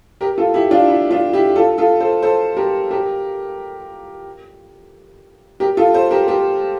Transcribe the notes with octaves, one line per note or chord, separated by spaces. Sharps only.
G4 A#4
F4 A4
E4 G4
D4 F4
E4
D4 F4
E4 G4
F4 A4
F4 A4
A4 C5
A4 C5
G4 A#4
G4 A#4
G4 A#4
F4 A4
A4 C5
G4 A#4
G4 A#4